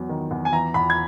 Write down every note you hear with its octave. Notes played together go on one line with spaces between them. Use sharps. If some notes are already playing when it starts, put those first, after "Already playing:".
Already playing: E2 F#3
D#3
E2
G#5
E3 A#5
E2 B5
G#6